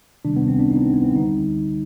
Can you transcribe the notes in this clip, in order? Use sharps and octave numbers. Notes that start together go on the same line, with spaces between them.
C3 D#3 G3 D4
B3
C4
D4
D#4
B3
C4
B3
C4
D3 G3 D#4